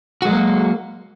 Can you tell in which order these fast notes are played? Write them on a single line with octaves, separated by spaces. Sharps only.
F#4 G#3 F#3 A#3